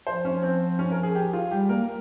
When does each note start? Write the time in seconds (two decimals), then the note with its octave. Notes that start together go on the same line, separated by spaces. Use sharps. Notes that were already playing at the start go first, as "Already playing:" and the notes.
0.07 F3 C5
0.25 C#4
0.43 C4
0.79 C#4
0.91 A#4
1.03 G#4
1.15 G4
1.33 F4
1.51 G3 G4
1.69 A#3 A#4